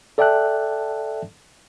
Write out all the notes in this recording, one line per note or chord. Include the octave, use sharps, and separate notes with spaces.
A4 D5 E5 G5 A5 F#6